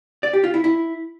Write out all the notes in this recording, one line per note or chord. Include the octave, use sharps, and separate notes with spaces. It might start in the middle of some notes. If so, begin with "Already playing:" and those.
D5
G4
F4
E4
E4